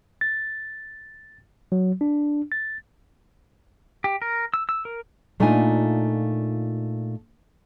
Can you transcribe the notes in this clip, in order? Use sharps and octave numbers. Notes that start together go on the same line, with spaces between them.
A6
F#3
D4
A6
G4
A#4
E6
E6
A#4
A#2 A3 D4 D#4 F4 G#5